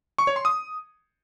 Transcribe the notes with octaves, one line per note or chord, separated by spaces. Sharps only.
C#6
C#5
C6
D#6